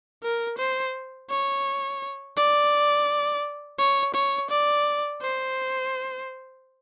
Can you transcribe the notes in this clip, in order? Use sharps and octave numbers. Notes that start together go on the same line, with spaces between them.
A#4
C5
C#5
D5
C#5
C#5
D5
C5